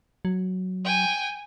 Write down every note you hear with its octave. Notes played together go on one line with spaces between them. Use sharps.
F#3
G5 G#5